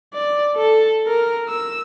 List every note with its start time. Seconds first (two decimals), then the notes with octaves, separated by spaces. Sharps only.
0.14 D5
0.56 A4
1.07 A#4
1.49 E6